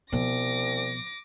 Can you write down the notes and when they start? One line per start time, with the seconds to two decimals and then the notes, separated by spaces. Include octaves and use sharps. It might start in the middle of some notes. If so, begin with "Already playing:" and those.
0.12 C2 B2 F3 D6 A#6